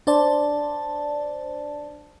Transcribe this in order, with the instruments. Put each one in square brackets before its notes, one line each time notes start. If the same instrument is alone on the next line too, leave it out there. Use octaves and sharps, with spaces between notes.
[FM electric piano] D4 C5 D5 A5